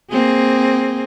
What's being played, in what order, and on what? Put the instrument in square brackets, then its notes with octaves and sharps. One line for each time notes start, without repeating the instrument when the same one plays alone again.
[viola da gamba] A#3 C4 G#4